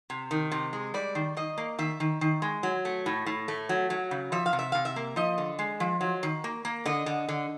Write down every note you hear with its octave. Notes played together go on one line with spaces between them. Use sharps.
C3
D#3
C3
G#3
G3 D5
D#3
D#3 D#5
A#3
D#3 E5
D#3
D#3
G#3
F#3
A3
A2
A2
A3
F#3
F#3
C#3
F3 E5
F5
C3
E5
C3 F5
E5
A#3
F3 D#5
D3
G#3
F3
F#3
D#3
A#3
A#3
D3 D#5
D3
D3